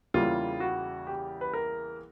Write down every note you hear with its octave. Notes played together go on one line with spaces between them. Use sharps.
E2 C#3 E3 G3 A#3 F4
F#4
G4
B4
A#4